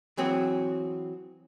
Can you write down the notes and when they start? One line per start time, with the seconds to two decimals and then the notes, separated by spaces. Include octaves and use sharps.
0.17 E3 F#3 C4 F#4 G#4